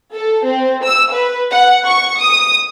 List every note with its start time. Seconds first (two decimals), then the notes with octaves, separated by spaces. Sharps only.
0.13 A4
0.45 C4
0.84 E6
1.13 B4
1.51 F#5
1.85 C#6
2.21 D#6